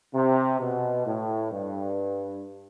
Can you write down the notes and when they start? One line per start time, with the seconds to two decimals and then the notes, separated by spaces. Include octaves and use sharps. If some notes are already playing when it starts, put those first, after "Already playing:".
0.13 C3
0.59 B2
1.06 A2
1.52 G2